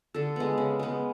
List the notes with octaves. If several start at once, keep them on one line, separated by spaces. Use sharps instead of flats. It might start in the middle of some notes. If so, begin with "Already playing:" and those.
D3 A4
G#3 B3
C#3
G#3 B3